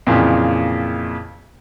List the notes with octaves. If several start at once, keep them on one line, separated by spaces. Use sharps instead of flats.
F2 A#2 C#3 E3